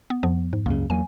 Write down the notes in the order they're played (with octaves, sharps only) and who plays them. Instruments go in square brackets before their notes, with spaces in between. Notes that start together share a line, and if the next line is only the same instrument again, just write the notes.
[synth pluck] B3
F2 F3 B3
G#2
[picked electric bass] C#2 F#2 C#3 [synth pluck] A#3
[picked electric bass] E2 F#3 A#3 [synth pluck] G#5